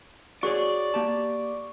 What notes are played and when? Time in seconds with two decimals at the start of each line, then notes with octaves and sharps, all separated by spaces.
0.43 F#4 G#4 C#5 D5 C#6
0.94 A#3 G4 A5